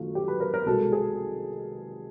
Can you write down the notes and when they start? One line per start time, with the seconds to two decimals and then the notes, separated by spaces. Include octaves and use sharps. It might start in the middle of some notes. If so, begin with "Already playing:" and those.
Already playing: F#2 D#3 F#3 A3 F4
0.15 G4
0.28 B4
0.40 A#4
0.54 A#4
0.66 C2 B2 G#3 A4
0.92 G#4